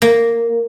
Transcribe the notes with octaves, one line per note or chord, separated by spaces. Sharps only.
A#3